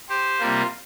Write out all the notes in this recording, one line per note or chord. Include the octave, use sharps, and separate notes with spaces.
G4 C5
C3 G3 A#3 F4